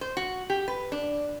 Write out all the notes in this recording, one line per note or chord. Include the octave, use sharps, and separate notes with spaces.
C5
F#4
G4
B4
D4